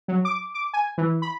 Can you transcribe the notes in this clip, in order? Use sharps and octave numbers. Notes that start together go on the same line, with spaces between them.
F#3
D6
D6
G#5
E3
B5